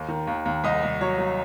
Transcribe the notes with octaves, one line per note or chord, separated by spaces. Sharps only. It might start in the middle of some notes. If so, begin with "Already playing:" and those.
Already playing: D#2
D#3
D#2
D#2
C2 D#5
C2
F#3 C#5
F#3